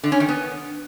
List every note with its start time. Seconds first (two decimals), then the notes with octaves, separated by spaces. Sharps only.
0.03 D3
0.12 C#4
0.20 D#3
0.28 B3